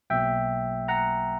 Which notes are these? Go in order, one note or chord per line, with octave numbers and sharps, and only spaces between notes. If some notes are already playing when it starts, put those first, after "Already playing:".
B1 B2 F#3 A#3 E5 G5
F#5 A#5